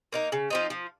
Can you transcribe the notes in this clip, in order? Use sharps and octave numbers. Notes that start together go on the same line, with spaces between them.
A#3 D#4 A#4
C#3
F3 C4 D#4
F3